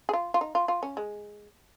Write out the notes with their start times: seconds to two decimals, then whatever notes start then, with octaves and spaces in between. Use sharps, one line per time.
0.09 G#4
0.13 F4
0.34 F4
0.41 D#4
0.55 F4
0.68 F4
0.83 C#4
0.97 G#3